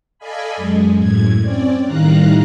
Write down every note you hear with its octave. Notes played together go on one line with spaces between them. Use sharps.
A4 D5 D#5 F5 G#5 B5
F#2 G#3
F#2 A2 G#6
C4 C#4 D5
A2 D#3 G3 F5 A#5 F#6